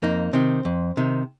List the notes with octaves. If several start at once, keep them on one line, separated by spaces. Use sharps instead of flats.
F2 A#3 D#4
C3 D#3 C4
F2
C3 D#3